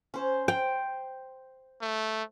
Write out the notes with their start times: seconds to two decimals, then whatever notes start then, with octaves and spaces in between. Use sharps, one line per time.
0.14 C#4 C5
0.48 C5 G5
1.82 A3